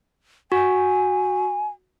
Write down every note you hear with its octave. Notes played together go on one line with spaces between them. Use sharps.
F#4 G#5